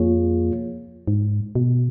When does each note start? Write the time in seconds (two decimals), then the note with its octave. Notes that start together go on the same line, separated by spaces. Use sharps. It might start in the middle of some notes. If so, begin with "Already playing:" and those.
Already playing: F2 A#3 F4 G#4 C#5
1.08 G#2
1.55 B2